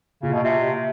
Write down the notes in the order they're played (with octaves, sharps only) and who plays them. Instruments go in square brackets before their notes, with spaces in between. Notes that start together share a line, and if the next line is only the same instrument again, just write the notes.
[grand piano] A#2 [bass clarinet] C#3
[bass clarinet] B2
C3